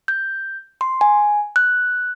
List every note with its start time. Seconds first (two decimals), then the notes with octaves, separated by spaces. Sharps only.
0.08 G6
0.81 C6
1.01 G#5
1.56 F#6